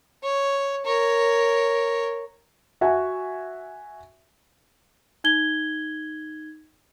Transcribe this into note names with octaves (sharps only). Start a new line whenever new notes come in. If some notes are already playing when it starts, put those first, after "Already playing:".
C#5
A#4 C#5
F#4 E5 F#5 G#5
D#4 G#6 G7